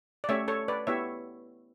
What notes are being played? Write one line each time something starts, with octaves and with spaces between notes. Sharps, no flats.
D5
A3 C#4 G4 C#5 E5
A4 C#5
B4 D5
B3 E4 G4 C#5 E5